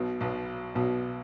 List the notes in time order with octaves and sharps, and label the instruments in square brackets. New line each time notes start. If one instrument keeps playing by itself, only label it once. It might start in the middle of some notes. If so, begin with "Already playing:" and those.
Already playing: [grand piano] B1 B2
B1 B2
B1 B2